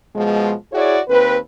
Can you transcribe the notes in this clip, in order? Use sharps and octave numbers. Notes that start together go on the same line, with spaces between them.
B2 F3 G#3
E4 F#4 G#4 C#5 D5
D#2 C4 B4